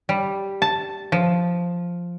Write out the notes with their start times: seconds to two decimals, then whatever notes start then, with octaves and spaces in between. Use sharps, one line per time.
0.09 G3
0.62 A5
1.12 F3